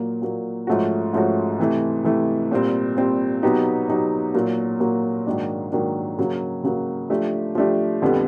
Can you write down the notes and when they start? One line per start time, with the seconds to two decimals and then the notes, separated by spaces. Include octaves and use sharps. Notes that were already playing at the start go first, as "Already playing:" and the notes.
Already playing: A#2 F#3 A#3
0.22 A#2 F#3 A#3
0.67 G#2 F3 A3 C#4 F#4
1.14 G#2 F3 A3 C#4 F#4
1.59 C3 E3 A3
2.04 C3 E3 A3
2.52 A#2 G3 C4
2.97 A#2 G3 C4
3.43 B2 F#3 B3 D#4 G4
3.88 B2 F#3 B3 D#4 G4
4.34 A#2 F#3 A#3
4.80 A#2 F#3 A#3
5.27 G#2 D#3 F#3 A#3 D4
5.72 G#2 D#3 F#3 A#3 D4
6.19 C#3 F#3 A#3
6.64 C#3 F#3 A#3
7.10 F3 A3 D4 G4
7.55 F3 A3 D4 G4
8.02 F2 D3 G3 B3